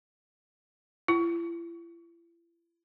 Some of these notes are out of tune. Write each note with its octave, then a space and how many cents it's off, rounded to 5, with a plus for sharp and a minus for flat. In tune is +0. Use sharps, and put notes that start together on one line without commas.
E4 +40